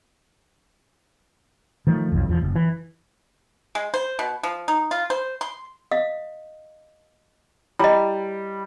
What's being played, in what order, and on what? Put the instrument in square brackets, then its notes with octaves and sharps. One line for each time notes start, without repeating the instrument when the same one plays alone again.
[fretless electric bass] D#3 F3 A3
B1 F2
D#1 E2 F3
F#1
E3
[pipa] G#3
C5
B2
F3
D#4
F4
C5
C6
[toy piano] D#5 F5 D#6
[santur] G3 [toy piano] E4 D#5